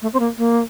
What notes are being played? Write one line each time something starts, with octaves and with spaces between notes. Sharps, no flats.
A3
C4
A#3
A#3